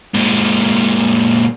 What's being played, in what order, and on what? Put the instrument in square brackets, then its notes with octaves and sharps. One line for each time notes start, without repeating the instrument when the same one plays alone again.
[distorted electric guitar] A#2 G#3